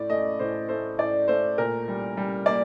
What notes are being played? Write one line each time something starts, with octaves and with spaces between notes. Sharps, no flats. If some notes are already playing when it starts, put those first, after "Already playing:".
Already playing: A2 D5
A3 D#5
A2 C5
A3 C5
A2 D5
A3 C5
A#2 A#4
G3
G3
A#3 D5